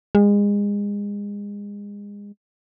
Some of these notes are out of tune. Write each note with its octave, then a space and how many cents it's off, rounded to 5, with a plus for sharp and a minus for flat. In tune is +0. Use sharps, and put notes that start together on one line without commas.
G#3 -30